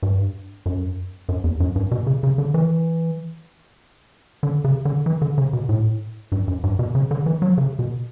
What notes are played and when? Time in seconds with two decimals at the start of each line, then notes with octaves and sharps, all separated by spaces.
0.03 G2
0.66 F#2
1.29 F#2
1.44 E2
1.60 F#2
1.76 G2
1.91 B2
2.06 C#3
2.23 C#3
2.38 D3
2.54 E3
4.43 D3
4.64 C#3
4.85 D3
5.06 E3
5.22 D3
5.38 C#3
5.53 B2
5.69 A2
6.32 G2
6.48 F#2
6.64 G2
6.79 B2
6.95 C#3
7.11 D3
7.26 E3
7.42 F#3
7.58 C#3
7.79 B2